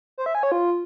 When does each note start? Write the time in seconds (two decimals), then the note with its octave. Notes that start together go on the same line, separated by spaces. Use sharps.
0.18 C5
0.26 E5
0.35 G#5
0.43 C#5
0.52 F4